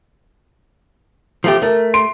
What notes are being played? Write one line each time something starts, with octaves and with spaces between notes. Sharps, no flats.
F3 A3 G4
A3 A#4
C6 D7